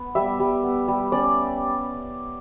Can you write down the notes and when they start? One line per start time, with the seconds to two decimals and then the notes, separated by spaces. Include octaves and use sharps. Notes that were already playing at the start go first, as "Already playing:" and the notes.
Already playing: B3
0.15 G3 E5
0.40 G3
0.64 B3
0.88 G3
1.12 C#4 D5